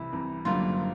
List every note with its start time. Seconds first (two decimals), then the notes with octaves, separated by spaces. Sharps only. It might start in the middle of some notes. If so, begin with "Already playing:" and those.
Already playing: C2 C3 E3 E4
0.12 C2 C3 E3
0.45 F#1 F#2 D3 G3 A#3 F4